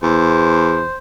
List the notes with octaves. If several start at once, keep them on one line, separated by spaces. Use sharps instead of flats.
E2 C5